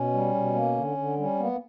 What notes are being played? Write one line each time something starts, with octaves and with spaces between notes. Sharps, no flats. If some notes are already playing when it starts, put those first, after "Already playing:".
Already playing: B2 C#4
G3
B2
A#3
D3
D3
G3 C#4
A#3 B3
A#3